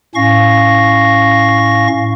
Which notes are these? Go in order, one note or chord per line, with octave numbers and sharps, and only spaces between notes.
A2 C#4 F5 C#6 A#6